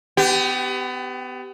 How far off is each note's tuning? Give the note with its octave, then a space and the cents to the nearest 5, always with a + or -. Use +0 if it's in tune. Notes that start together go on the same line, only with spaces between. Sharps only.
B3 +30 G4 -5